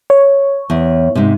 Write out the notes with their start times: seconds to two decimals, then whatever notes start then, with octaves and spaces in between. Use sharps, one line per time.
0.10 C#5
0.70 E2
1.15 G#2 C3